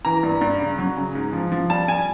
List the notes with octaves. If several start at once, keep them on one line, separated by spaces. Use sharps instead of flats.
E3 A#5
G2
G2
C#3
F#3
C#3
G#2
F3
F3
G3 A5
G3 G#5